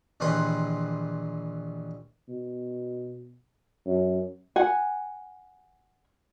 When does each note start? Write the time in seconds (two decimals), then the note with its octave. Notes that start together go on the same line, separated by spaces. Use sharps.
0.20 A#1 D#2 E3 B4 C6
2.28 B2
3.86 F#2
4.56 F#5 G#5